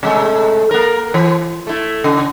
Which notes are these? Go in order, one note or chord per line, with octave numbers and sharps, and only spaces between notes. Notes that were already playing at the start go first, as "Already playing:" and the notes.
C3 G#3 A3
A#3 A#4
E3
A3 E4
C#3